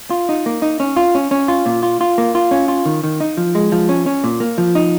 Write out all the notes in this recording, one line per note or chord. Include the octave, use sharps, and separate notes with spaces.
F4
D#4
A#3
D#4
C#4
F4
C#4
C#4
F4
A#2
F4
F4
A#3
F4
C#4
F4
D#3
D#3
D#4
F3
G#3
F3
C#4
C#4
A#2
A#3
F3
D#4